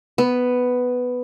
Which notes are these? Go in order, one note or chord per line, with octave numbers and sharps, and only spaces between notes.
B3